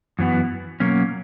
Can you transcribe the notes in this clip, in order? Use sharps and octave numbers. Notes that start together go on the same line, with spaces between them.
F#2 E3 B3 F#4
B2 F#3 A#3 C#4